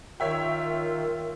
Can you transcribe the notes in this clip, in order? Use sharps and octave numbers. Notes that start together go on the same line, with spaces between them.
D#3 F4 A#4 C#5 E5 G5